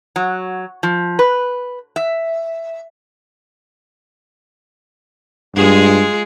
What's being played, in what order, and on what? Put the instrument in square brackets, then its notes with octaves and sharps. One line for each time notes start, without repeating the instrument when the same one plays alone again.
[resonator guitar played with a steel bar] F#3
F3
B4
E5
[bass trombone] G2 [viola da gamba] G#3 F4 G#4